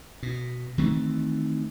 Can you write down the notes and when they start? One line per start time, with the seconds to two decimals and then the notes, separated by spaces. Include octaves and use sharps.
0.23 B2
0.78 D#3 E3 A3 C4